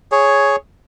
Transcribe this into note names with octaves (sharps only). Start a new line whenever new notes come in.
G#4 C#5